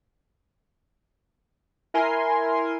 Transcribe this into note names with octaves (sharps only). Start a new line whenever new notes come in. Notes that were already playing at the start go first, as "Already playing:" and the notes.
E4 A#4 G#5 C6